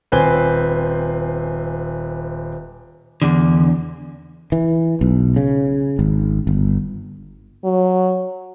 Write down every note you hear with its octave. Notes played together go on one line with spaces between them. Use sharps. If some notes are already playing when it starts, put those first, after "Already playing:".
D#1 C4 B4 C5 G#5 G7
E2 D3
E3
B1
C#3
G#1
G1
F#3